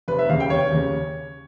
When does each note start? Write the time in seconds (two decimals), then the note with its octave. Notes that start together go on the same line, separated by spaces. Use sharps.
0.08 F1 B4
0.18 E5
0.29 D#2 C#3 F5
0.40 G5
0.50 F1 C#5
0.71 D#2 C#3